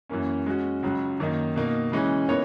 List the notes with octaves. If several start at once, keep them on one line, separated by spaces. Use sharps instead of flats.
F#2 E3 A#3 C#4
G#3 C#4 F#4
C#2 C#3 F#3
F#2 D#3 A#3 D#4
B2 A#3 D#4
C#3 E3 G#3 C#4
E3 B3 D#4 A#4 C#5